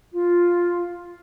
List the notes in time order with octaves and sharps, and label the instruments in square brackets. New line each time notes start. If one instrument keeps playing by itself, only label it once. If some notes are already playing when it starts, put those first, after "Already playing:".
[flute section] F4